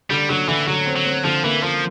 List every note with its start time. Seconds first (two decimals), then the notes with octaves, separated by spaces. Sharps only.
0.10 D3 G3
0.29 D3 F#3
0.48 D3 E3
0.67 D3 F#3
0.86 C4
0.96 F#3
1.06 C4
1.24 D3 F3
1.44 E3 A#3
1.62 F3 A#3